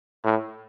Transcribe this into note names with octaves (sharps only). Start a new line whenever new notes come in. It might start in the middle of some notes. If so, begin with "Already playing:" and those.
A2